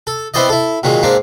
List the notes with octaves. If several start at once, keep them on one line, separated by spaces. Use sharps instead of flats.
A4
B3 C4 E4 C5 D5 D#5
E4 A4
A#2 D#3 F#3 G#3
G#2 A#3 C4 D4